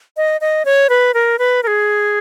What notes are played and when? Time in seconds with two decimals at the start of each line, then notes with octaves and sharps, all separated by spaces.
0.17 D#5
0.41 D#5
0.65 C#5
0.89 B4
1.14 A#4
1.39 B4
1.63 A#4
1.67 G#4